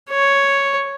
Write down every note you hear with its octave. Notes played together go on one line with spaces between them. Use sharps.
C#5